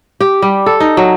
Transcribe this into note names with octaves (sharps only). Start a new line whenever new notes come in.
G4
G3
A4
D#4
F#3